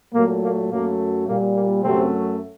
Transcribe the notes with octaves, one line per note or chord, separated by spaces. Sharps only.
A#2 F#3 A3 A#3
A#3
F#2 F#3 A3 A#3
A#2 G3 A#3
A#3
F#2 C3 F#3 A3 C4